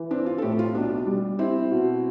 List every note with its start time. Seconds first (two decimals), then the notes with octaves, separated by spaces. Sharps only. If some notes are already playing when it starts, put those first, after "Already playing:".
Already playing: E3
0.11 C4 D4
0.26 F4
0.38 A4
0.42 A2 G4
0.59 F4
0.75 B1 D4
1.07 G3
1.39 C4 E4
1.71 B2